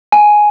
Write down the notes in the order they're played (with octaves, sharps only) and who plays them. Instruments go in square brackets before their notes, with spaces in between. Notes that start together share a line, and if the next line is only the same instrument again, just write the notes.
[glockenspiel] G#5